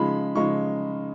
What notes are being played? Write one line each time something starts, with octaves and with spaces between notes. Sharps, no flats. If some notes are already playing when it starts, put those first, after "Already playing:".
Already playing: C#3 F3 G#3 D#4 B5
C#3 F3 G#3 D#4 C#6